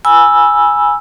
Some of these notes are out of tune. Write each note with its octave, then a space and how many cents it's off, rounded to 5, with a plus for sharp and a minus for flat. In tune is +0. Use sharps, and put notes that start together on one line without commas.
G#5 +0 B5 -20 E6 +0